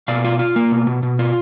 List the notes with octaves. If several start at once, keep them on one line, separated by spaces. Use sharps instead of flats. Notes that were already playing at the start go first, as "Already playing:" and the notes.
B2 D5 F5
F4
F4
A#3
B2
B2
B2
F4